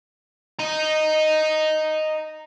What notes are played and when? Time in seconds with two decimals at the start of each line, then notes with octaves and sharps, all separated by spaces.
0.59 D#5 A#5